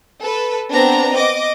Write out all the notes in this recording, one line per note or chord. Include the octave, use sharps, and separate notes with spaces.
A4 B4
B3 C4 D4 A#5
D#5 D6